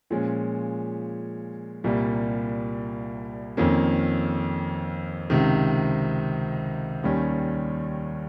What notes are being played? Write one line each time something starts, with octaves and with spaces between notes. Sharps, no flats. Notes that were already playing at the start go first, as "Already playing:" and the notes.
A#2 F3 G#3 C#4
C2 A#2 G3 A#3
F2 D#3 A#3 C#4
C#2 C3 D#3
D#2 D#3 G3 C#4